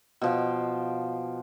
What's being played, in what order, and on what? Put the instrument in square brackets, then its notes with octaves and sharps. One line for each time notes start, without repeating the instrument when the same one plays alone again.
[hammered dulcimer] B2 F3 G5